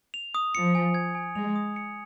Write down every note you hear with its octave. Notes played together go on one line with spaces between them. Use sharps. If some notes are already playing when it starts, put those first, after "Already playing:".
F7
D#6
F3 C#7
G#5
G#6
G#5
G#3 F7
D#6
C#7